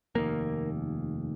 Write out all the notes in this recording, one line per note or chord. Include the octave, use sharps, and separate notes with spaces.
F1 D#2 A#3